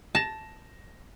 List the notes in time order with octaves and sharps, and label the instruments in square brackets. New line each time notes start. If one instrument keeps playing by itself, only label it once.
[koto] A5 [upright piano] A#6 E7